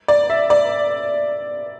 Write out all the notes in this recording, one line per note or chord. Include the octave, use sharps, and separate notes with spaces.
D5
E5
D5